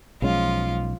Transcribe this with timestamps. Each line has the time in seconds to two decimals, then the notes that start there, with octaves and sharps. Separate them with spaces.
0.22 B1 F3 G#3 C#4 F4